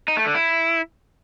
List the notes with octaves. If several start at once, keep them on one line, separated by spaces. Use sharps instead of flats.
D#4
A3
D3
E4